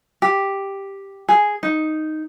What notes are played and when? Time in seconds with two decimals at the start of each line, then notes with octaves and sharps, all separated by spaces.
0.22 G4
1.29 G#4
1.63 D#4